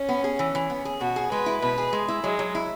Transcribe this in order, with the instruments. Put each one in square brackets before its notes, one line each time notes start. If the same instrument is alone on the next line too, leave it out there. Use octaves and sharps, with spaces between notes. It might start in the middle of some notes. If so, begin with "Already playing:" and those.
Already playing: [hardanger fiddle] C#4
[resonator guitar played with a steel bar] B3
G#4
E3
E3
B3
G#4
[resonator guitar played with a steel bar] B2 [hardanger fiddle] F#4
[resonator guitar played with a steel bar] G#4
[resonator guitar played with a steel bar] G#3 [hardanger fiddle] B4
[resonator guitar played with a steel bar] E4
[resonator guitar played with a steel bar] B2 [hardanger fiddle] B4
[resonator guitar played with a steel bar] G#4
G#3
E4
[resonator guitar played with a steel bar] F#3 [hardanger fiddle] G#3
[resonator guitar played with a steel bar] F#3
E4